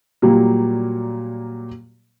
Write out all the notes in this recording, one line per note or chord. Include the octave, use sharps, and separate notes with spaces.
A#2 F#3 G3 A#3